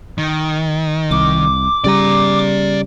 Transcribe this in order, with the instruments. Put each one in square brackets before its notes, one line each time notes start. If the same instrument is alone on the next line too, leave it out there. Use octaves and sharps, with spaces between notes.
[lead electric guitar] D#3
[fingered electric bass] C2 [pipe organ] D6
[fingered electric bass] C#3 G3 [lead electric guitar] D5 A#5